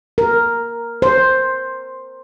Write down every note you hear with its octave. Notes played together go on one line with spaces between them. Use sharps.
A#4
C5